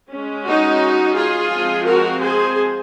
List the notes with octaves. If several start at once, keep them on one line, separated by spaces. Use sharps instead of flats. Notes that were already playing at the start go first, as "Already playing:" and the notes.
G#3 C#4
D#4 F#4
F4 G#4
F3 G#3 C4
F#4 A#4
G#4 C5